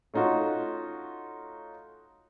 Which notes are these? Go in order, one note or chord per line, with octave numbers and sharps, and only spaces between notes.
A3 C#4 D#4 F4 F#4